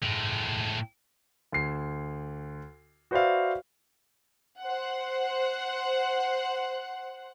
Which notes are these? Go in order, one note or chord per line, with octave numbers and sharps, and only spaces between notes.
A2 G#3
D2 C7
F#4 B4 C5 D5 E5 F5
C5 F#5